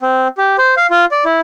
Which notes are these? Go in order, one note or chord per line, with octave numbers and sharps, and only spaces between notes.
C4
G4
C5
F5
F4
D5
E4